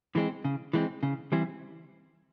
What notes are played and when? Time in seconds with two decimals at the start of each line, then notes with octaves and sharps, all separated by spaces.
0.15 E3 G#3 C4
0.44 C#3
0.73 E3 G#3 C4
1.03 C#3
1.32 E3 G3 C4 E4